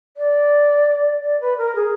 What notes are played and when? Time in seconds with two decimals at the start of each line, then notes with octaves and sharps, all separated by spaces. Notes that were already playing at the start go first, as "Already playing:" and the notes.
0.17 D5
1.23 D5
1.41 B4
1.58 A#4
1.75 G#4